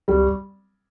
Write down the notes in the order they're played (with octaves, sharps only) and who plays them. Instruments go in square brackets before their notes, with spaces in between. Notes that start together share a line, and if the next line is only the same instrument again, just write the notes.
[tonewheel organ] C#2 [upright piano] G3